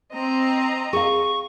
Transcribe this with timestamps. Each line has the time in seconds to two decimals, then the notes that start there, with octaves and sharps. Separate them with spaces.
0.13 C4 D#5 A#5
0.93 G#4 F5 C#6